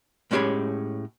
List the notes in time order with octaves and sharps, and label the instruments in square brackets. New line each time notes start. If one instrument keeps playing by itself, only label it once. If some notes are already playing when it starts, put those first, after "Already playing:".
[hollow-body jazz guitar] A2 G#3 C#4 G4 G#4 B5